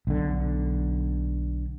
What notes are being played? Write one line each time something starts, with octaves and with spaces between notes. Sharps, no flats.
B1 D3